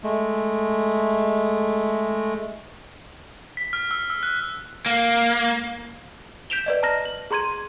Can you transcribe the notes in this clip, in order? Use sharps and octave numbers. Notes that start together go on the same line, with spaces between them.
G#3 A3
B6
F6
E6
E6
F#6
A#3
G6 B6 D7 E7 F7 G7
B4 D5 D#5
A5 A#5 F6 A#6
F#7
G#4 A#5 C6 G#6 D#7